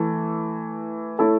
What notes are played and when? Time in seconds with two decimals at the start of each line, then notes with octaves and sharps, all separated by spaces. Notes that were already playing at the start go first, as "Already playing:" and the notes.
Already playing: E3 A3 E4
1.19 A3 E4 A4 C#5